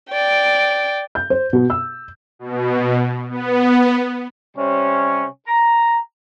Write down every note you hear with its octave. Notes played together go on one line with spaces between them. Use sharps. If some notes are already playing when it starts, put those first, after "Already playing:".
D5 G5
G6
C5
B2
E6
B2
B3
C3 G3 C#4
A#5